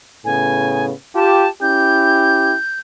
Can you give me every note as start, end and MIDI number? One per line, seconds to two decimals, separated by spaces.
0.25 0.92 45
0.25 0.92 49
0.25 0.92 59
0.25 0.85 80
1.15 1.46 65
1.15 1.46 67
1.15 1.48 81
1.62 2.54 61
1.62 2.54 64
1.62 2.54 67
1.62 2.79 91